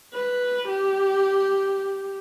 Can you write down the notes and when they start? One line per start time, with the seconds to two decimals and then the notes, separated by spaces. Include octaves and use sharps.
0.14 B4
0.68 G4